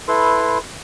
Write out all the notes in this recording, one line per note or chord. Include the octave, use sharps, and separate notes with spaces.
E4 A4 B4 C6